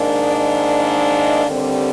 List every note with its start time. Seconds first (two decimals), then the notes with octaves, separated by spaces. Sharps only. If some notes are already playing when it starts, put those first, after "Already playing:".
Already playing: G#2 D#3 A#3 D4
0.26 D5
0.65 D5
1.46 D#2 D3 G3 C4